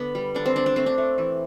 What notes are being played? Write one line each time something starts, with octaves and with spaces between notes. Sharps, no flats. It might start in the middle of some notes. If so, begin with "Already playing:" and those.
Already playing: D3 B3 D4
G3
D3 D4
C4
D3 D4
D4
A3 C4
D4
A3
E3